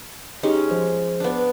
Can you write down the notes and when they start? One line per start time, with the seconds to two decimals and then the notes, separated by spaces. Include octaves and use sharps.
0.43 G#3 C#4 D#4 G4
0.71 F3 C5
1.20 B3 D4